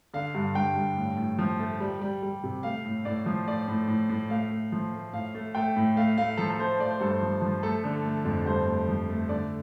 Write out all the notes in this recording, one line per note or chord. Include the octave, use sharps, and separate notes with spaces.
D3 F5
G2
G2 G5
G2
A2
A2
F3
A3
G3
G3
G3
C3
A3 F5
A2
A2 D5
F3
A2 D5
A2
A2
A2
A3 F5
A3
F3
A3
A2 F5
A3
A3 G5
A2
A3 F5
A3 F5
F3 A4
A4
A3 C5
A3 D5
C5
G2 A4
C5
F3
F3
A3 A4
D3
A3
F2
G2 C5
A3
F3
A3
D3 D5